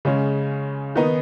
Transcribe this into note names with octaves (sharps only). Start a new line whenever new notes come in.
C#3 G#3 C#4
D#3 B3 D#4